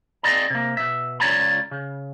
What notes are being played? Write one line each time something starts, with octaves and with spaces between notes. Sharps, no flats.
C4 G#4 B4 D5 D#5 A#5
C3 A#3
B2 E5
C#2 F4 C#5 D5 A#5 B5
C#3